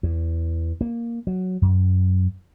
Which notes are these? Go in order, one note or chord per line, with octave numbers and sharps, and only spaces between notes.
E2
A#3
F#3
F#2